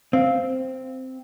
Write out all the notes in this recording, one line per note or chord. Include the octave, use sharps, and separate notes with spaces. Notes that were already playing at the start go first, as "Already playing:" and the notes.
C4 F5